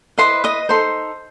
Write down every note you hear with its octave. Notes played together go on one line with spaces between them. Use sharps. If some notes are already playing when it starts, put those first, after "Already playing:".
E4 B4 C5 D#5 C6
D#5 D#6
D#4 A4 C5 C6